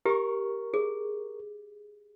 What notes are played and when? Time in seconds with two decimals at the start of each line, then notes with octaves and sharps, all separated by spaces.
0.06 G4 A#4 C#6
0.74 G#4